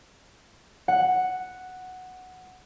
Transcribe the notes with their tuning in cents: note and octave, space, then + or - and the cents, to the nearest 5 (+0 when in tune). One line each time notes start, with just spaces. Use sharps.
F#5 +0